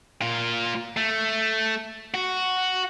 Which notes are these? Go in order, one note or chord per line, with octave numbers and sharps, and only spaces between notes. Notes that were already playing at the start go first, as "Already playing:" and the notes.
A#2 F4
A3
F#4